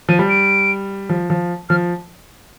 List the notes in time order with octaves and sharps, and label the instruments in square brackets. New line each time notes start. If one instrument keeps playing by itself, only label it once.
[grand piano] F3 [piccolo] D#7
[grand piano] G3
[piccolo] D7
[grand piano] F3
F3
[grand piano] F3 [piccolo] F6